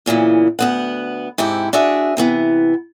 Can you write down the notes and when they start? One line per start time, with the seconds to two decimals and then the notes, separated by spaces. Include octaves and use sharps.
0.06 E2 A#2 C#3 E3
0.59 D2 B3 F#5
1.38 G#2 C3 E4 G4
1.73 D4 F#4 G#4 E5
2.17 C3 E3 B3